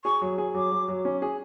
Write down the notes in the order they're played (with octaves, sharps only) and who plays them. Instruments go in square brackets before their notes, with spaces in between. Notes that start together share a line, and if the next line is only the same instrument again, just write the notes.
[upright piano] G#4 [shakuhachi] C#6
[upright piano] F#3
G#4
[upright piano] F#3 [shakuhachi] D6
[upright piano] F#3
F#3
C#4
G#4